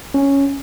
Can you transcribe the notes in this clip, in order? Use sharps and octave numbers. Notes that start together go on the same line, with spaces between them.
C#4